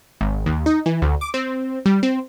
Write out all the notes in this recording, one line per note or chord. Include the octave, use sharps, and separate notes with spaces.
G#1
D#2
D#4
E3
D2
D6
C4
G3
C4